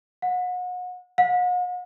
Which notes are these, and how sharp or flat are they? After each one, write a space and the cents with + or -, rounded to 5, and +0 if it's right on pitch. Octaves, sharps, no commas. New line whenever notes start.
F#5 -35
F#5 -45